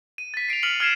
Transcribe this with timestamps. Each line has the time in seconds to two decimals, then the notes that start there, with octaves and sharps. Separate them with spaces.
0.18 D#7
0.34 A6 B6
0.49 C7 D7 D#7 F7
0.63 F6 B6 C#7 D#7 F7 F#7
0.80 F6 G#6 C7 E7